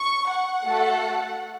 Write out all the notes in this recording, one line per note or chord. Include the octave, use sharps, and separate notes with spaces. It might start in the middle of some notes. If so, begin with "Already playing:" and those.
Already playing: C#6
F#5
A3 F#4 A4